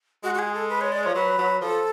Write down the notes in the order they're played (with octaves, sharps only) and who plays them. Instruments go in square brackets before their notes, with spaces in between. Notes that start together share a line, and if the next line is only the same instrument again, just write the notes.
[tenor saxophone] G#3 [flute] F#4
[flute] F#4
G#4
A4
B4
C#5
D5
[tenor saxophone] F3 [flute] C#5
[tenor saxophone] F#3 [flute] B4
[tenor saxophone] F#3
[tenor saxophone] F3 [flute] A4